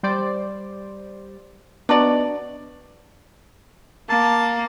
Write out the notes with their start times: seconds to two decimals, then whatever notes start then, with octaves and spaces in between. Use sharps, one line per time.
0.03 G3 C5 D5
1.89 B3 D4 D#4 F#4 D5
4.09 A#3 A5